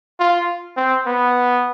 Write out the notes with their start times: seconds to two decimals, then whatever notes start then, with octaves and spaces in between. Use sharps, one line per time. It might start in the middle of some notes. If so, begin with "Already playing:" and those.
0.20 F4
0.77 C4
1.06 B3